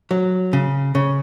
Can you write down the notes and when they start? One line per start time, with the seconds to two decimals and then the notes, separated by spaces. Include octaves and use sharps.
0.11 F#3
0.53 C#3
0.95 C#3